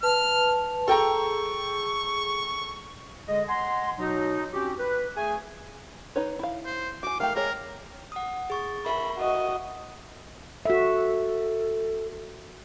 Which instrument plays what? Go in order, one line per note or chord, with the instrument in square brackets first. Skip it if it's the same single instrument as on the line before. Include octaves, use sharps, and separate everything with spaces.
[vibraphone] B4 A5 [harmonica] F6
[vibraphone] G#4 [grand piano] A4 G5 A#5 [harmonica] C#6
[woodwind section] D3 G#3 G#4 D#5
D#5 F#5 G#5 A#5 C6
B2 F#3 D#4
C4 C#4 F#4 G4
B4
A3 G#4 G#5
[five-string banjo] D#4 B4 C#5
E4 F5
[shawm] C5
[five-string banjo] F#4 G#5 [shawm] D6
[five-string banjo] D#3 A3 G4 [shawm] F5
[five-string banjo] G#3 G#4 C#5 [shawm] A#4
[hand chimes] F#5 D#6
G#4 C#6 A6
[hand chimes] A#4 E5 C#6 [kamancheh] B5
[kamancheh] F#4 D#5
[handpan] F#4 E5 [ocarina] A4